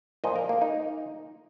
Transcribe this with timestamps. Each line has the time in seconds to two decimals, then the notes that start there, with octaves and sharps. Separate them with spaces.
0.24 A#2 F3 D#5
0.36 A#4
0.49 A#3
0.62 D#4